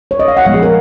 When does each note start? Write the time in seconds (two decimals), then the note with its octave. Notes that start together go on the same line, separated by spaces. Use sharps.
0.11 C#5
0.19 D#5
0.28 F5
0.37 F#5
0.45 A#2 F3 G#3 B3 F5
0.54 G#4
0.63 A#4